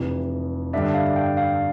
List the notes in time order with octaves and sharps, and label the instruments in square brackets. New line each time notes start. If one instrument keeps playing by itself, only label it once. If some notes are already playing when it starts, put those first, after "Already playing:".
Already playing: [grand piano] F1 F2 C3 E3
[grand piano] G2 D3 G3 D4 [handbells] E5
[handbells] F5
G5
F5